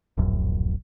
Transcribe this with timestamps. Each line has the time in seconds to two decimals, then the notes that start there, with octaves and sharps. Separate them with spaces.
0.18 D1 A#1 F#2